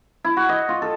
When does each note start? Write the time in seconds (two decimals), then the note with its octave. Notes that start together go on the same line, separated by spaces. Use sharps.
0.24 E4
0.37 F#4
0.49 D#5
0.69 F4
0.82 A4